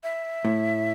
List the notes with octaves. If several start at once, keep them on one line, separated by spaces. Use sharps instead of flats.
E5
A2